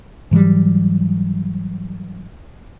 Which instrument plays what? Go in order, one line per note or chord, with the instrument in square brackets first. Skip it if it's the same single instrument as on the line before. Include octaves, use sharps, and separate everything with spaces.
[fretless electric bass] G#2 E3 F#3 G3